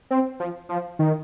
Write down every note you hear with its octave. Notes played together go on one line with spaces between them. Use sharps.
C4
F3
F3
D#3